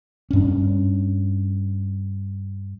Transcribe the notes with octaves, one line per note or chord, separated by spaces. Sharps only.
G2 C#4